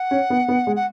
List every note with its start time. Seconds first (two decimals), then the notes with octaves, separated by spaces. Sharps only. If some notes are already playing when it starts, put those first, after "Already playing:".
Already playing: F#5
0.11 C#4
0.30 B3
0.48 B3
0.67 G#3
0.75 F#5